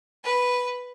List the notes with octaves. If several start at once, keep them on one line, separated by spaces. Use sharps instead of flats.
B4